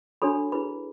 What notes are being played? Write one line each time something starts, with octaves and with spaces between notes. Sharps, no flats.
D4 F#4 A4 C#5 B5
E4 G#4 B4 B5